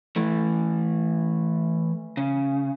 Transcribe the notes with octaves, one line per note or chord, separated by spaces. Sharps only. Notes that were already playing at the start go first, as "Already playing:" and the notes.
E3 A3
C#3